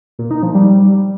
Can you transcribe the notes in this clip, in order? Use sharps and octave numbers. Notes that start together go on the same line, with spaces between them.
A#2
D#4
F3
G3